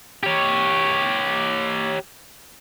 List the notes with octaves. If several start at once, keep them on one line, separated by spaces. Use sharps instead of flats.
G4 C#5